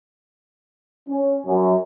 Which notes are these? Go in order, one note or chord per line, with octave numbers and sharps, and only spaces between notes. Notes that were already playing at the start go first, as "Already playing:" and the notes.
C#4
F#2